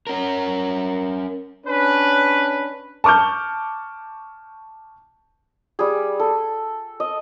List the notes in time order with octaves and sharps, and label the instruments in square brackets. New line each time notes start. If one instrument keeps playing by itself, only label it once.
[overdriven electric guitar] C#4 A#4
[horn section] C#4 D4 B4
[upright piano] A5 C#6 D6 F6 G6
[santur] G3 G#4
A4
D#5